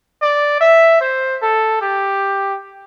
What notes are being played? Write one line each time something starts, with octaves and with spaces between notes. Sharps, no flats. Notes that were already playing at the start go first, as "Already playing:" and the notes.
D5
E5
C5
A4
G4